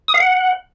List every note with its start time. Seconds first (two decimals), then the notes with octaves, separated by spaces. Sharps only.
0.08 D#6
0.14 F5
0.20 F#5